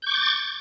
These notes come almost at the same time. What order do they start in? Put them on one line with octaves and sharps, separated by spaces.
G6 C#6 D6 A6